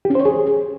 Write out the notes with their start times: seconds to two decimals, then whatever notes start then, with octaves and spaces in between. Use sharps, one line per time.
0.05 G4
0.10 C#4
0.15 C5
0.20 C#5
0.25 G#4